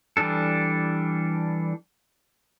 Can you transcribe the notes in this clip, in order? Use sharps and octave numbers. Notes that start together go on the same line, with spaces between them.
E3 G3 D4 A4